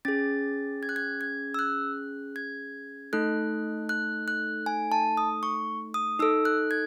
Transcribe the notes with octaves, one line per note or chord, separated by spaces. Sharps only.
C#4 G#4 A6
G#6
F#6
G#6
G#6
E6
F#6
G#6
A3 D#4 A4 F#6
F#6
F#6
G#5
A5
D#6
C#6
D#6
D#4 A4 E6
F#6
G#6